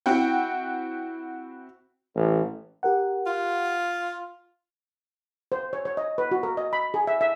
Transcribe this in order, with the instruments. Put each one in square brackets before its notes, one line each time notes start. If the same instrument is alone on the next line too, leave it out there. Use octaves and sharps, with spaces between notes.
[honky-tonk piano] C4 E4 F#4 F#5 G5
[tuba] A1
[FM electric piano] G4 A#4 F#5
[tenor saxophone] F4
[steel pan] C5
C#5
C#5
D#5
B4
F#4
A#4
D#5
B5
G#4
E5
E5